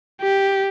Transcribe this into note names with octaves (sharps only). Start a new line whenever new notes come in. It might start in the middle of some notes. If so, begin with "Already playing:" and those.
G4